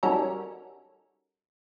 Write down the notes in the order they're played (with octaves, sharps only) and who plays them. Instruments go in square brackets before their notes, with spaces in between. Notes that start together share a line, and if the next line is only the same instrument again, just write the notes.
[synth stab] G3 C#4 D#4 F#4 A4 A#4